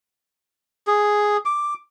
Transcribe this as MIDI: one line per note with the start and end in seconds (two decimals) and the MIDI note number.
0.87 1.37 68
1.45 1.74 86